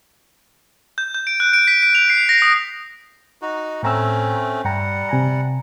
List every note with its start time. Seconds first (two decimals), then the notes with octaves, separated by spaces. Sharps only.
0.98 G6
1.15 G6
1.27 D7
1.40 F#6
1.53 D7
1.67 B6
1.83 D7
1.95 F7
2.10 C7
2.29 A#6
2.42 D#6
3.42 D#4 F#4
3.83 A2 A3 C4 C#4 A#5 E6
4.65 G2 G3 F#5 G5 A#5
5.09 C3 G#5 A#5